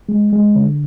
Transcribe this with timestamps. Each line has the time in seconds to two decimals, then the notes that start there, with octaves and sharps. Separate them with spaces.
0.09 G#3
0.33 G#3
0.55 D3